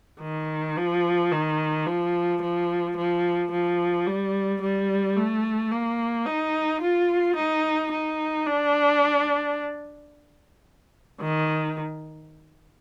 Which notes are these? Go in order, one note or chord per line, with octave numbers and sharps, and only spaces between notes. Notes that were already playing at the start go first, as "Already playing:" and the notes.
D#3
F3
D#3
F3
F3
F3
F3
G3
G3
A3
A#3
D#4
F4
D#4
D#4
D4
D#3